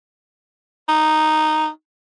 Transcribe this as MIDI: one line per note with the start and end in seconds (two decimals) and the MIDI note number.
0.89 1.68 63